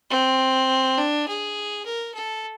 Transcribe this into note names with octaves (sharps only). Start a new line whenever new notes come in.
C4
D4
G#4
A#4
A4